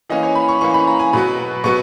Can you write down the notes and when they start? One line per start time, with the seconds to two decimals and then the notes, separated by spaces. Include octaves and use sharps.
0.10 E3 A#3 C#4 D#5
0.23 C#5
0.35 B5
0.49 C#6
0.61 E3 A#3 C#4 C#6
0.74 B5
0.87 A#5
0.99 G#5
1.13 B2 F#3 B3 B5
1.64 B2 F#3 B3 C#6